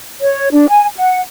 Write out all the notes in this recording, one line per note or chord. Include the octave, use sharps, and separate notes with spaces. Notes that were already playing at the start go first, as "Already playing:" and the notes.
C#5
D4
G#5
F#5